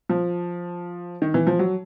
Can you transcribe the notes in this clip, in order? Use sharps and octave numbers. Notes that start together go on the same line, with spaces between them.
F3
D#3
E3
F3
F#3